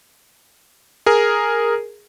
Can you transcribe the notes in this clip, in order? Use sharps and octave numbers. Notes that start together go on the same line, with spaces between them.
G#4 A#4